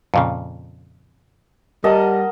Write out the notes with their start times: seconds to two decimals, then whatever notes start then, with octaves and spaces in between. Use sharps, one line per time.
0.14 F2 A#2 C#3
1.84 G3 A#4 D#5 F#5 A5